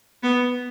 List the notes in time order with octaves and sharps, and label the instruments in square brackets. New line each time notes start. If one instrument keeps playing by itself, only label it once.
[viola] B3